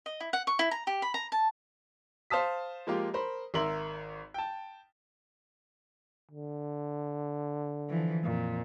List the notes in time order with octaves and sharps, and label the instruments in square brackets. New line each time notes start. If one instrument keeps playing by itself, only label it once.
[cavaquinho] D#5
E4
F#5
C#6
E4
A#5
G4
B5
A#5
A5
[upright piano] C5 F5 A5 D#6 B6
F3 G#3 A#3 F4 G4
A#4 C5 B5
G#1 A#4 E5 C6 F#7
G5 A5
[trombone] D3
[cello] E3 F3
F2 A#2